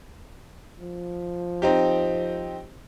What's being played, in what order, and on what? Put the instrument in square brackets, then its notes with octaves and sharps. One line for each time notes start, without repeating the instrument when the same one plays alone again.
[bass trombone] F3
[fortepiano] C4 D#4 G4